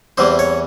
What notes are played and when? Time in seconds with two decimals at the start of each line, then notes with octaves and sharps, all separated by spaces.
0.18 E2 C3 E3 G3 C5
0.39 C#5